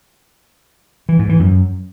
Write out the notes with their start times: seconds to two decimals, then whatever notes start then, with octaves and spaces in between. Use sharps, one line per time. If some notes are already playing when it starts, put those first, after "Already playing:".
1.09 E3
1.19 G#2
1.29 E3
1.40 F#2